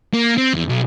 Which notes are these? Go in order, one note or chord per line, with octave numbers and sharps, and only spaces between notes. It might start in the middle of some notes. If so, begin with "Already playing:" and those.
A#3
C4
E2
B1